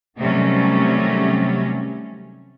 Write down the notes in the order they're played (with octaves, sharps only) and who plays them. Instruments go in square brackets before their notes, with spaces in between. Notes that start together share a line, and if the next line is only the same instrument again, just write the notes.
[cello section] C3 D#3 F#3 G3 A3 C#4